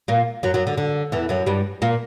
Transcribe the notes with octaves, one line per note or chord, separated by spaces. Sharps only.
A#2 A#3
F#2 F#3
F#2 F#3
D3
D3
E2 E3
F#2 F#3
G2 G3
A#2 A#3